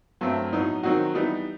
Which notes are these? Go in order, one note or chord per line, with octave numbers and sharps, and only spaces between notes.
G2 F#3 A3 C4
A2 F#3 B3 D#4
D#3 F#3 C4 D#4 F#4
E3 G3 B3 D#4